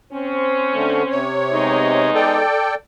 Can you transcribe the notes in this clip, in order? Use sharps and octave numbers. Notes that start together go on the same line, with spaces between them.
C4 C#4 C5
D3 A3
C3 C#5
G#3 B3 D#4
A4 D5 G5